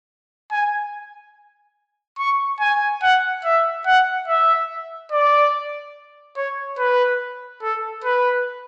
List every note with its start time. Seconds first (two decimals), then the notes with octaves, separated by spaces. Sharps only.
0.51 G#5
2.19 C#6
2.60 G#5
3.02 F#5
3.44 E5
3.86 F#5
4.28 E5
5.12 D5
6.37 C#5
6.78 B4
7.62 A4
8.04 B4